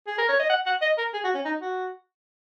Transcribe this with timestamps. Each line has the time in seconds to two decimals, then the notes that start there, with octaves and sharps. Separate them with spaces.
0.07 G#4
0.18 A#4
0.29 C#5
0.39 D#5
0.50 F#5
0.66 F#5
0.82 D#5
0.98 A#4
1.14 G#4
1.24 F#4
1.35 C#4
1.45 D#4
1.61 F#4